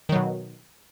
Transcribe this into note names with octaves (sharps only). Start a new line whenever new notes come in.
B2 D#3 F#3